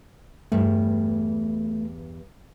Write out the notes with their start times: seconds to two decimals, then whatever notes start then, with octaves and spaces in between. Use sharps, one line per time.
0.52 E2 G2 A3